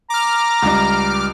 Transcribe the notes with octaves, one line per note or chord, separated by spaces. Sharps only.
A#5 D6 F6
C#2 G3